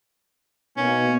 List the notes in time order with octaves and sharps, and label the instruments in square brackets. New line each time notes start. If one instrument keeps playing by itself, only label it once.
[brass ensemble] B2 A#3 D#4 [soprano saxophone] C#4